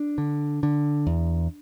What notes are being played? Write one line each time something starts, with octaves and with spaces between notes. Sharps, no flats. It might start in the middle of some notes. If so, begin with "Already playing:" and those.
Already playing: D4
D3
D3
E2